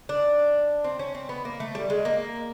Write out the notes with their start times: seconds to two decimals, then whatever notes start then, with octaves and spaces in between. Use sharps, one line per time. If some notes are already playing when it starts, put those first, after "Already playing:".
0.09 D4
0.84 C4
0.99 C#4
1.15 C4
1.29 B3
1.45 A#3
1.60 A3
1.75 G3
1.90 G#3
2.05 A#3